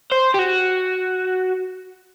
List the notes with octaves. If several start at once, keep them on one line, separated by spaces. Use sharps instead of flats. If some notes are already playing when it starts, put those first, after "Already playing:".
C5
G4
F#4